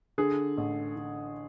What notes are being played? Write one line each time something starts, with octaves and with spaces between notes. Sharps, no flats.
D3 G#4
A1
D3